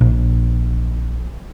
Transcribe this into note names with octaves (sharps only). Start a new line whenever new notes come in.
A#1